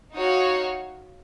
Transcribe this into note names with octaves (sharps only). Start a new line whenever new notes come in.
D#4 F#4 C#5 F5